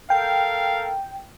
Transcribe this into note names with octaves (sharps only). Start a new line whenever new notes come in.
A4 A#4 F5 G5